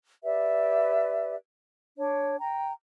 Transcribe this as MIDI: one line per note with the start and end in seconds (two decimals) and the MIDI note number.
0.23 1.35 67
0.23 1.35 71
0.23 1.35 74
0.23 1.35 76
1.96 2.36 62
1.96 2.36 73
2.39 2.72 79
2.39 2.72 82